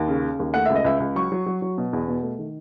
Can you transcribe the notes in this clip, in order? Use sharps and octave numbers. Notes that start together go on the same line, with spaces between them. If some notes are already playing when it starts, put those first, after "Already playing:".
Already playing: D#2
C#3
C#3
D#2
A3 F#5
C#2 E5
D#5
C#2 E5
C#2
F#3 C#6
F#3
F#3
F#3
B2
E2
B2
A3
D#3